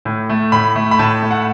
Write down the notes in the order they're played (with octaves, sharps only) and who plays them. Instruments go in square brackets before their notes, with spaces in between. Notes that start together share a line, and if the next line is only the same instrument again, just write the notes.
[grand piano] A2
A3
A2 B5
A3
B5
A2 A5
A3
F#5